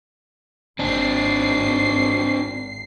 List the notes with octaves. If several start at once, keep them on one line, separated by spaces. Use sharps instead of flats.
G#1 C4 D4 C7